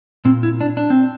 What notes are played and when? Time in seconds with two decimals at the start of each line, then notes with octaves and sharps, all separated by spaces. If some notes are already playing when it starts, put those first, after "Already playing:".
0.25 A#2 C4
0.43 E4
0.61 D4
0.77 D4
0.90 C4